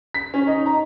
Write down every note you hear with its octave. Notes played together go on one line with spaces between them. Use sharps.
B6
C#4
D#4
A#5